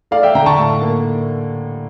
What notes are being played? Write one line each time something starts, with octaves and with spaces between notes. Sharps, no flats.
A3 D5 F5
E5 G5
D3 G5 A#5
A5 C#6
A2
A#3